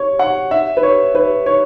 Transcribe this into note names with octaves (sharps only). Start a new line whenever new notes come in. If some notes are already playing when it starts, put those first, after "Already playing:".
Already playing: C#5
F#5
E5
B4
C#5
B4
C#5